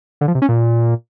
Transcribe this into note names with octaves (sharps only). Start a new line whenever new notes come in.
D3
F3
C3
C#4
A#2